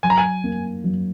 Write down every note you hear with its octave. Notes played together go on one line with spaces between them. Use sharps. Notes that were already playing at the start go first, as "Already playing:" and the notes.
F#3 G#5
A#5
G#5
A#3
F#3